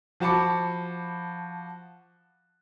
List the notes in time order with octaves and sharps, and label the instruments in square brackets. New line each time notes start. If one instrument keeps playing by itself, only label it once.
[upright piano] F3 F#4 A5 B5 D6 C#7